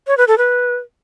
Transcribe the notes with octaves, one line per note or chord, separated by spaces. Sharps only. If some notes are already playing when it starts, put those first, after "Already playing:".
C#5
B4
A4
B4